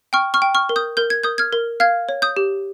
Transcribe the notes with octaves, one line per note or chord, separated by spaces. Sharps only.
G5 C#6 F6
C#6 F6
G5
C#6 F6
A#4
D#6 G6
A#4 G6
G#6
A#4 D#6 G6
F6 G#6
A#4
F5 F6 G#6
C#5
D#6 G6
G4